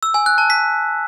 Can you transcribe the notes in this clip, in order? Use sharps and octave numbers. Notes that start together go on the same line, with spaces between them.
E6
G#5
F#6
A5
B6